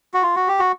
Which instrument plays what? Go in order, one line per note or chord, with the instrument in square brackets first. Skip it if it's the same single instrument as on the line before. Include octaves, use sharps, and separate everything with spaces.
[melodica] F#4
F4
F#4
G4
F#4